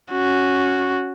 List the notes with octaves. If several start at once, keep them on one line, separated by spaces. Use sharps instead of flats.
C#4 F#4